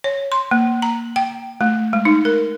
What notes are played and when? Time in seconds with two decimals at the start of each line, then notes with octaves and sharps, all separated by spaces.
0.04 C#5
0.32 C6
0.51 A#3
0.82 A#5
1.16 G5
1.61 A3
1.93 G#3
2.05 D#4
2.25 A#4